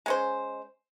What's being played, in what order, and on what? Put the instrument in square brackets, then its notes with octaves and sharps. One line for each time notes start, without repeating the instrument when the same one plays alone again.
[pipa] G#3 C#4 C5